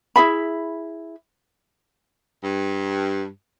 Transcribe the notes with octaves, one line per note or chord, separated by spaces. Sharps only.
E4 G#4 E5 B5
G2